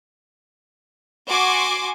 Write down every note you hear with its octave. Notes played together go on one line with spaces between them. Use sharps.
F#4 G#5 C6 D6